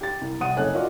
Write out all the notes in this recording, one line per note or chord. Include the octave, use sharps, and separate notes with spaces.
G4 A6
C2
C3 G3 F#5 D#6 D#7
F#1 A4 C#5 D#5 G#5 F#6
F4 F#4 A#4 D5 D#5 F#5